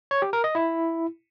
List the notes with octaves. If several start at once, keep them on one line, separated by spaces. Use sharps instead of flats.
C#5
G4
A#4
D#5
E4